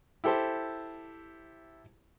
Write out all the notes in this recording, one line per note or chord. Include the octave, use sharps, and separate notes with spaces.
E4 G4 A4 C5